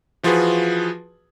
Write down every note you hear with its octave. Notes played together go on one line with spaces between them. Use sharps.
E3 F3 F4 F#4 G#4 B4